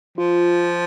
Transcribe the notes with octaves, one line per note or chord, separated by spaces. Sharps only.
F3 F4